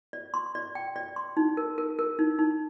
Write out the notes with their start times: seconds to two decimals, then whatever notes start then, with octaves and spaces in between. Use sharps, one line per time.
0.13 D5
0.34 C6
0.55 D5
0.75 G5
0.96 D5
1.16 C6
1.37 D#4
1.57 A#4
1.78 A#4
1.99 A#4
2.19 D#4
2.39 D#4